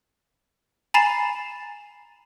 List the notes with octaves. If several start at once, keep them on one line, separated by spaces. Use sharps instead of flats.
G#5 A#5 B5 A6 C7 E7